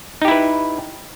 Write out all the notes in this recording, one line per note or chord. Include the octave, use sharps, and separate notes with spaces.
D#4 E4 G4 B4